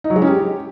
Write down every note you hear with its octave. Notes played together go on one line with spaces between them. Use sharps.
D#4
F#3
G#3
C#4
G4